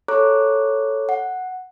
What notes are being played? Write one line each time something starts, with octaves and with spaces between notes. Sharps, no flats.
A4 C#5 A#5 C#6 D6 F#6
F#5